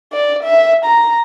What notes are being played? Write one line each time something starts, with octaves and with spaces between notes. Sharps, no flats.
D5
E5
A#5